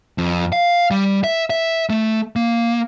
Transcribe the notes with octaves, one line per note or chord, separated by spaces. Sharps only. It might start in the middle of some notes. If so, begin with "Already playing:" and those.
F2
F5
G3
E5
E5
A3
A#3